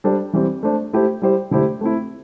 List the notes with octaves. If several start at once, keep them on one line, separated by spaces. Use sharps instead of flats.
G3 D4 A4 C5
E3 G3 C4
A3 D4 C5
A3 E4 G4 C5
G3 E4 G4 C5
D3 A3 E4 G4 C5
A3 C4 E4